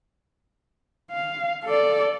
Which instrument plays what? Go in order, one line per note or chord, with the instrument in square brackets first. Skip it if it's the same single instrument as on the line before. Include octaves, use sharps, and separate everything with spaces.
[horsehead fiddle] F5
A4 D5